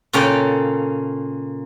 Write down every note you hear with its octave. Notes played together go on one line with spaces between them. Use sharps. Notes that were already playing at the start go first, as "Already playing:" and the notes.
A#2 C#3 C#4 A4 G5